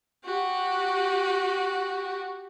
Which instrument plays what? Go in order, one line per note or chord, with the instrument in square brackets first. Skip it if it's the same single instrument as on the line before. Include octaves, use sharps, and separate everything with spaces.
[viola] F#4 G4